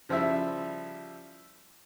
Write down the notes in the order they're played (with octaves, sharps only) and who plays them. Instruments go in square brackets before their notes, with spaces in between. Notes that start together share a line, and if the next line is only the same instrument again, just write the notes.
[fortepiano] C#3 F3 G3 E4 E5